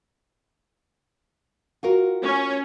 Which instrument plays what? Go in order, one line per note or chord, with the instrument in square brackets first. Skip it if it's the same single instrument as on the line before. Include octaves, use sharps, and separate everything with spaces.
[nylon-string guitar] F4 F#4 A#4
[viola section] C#4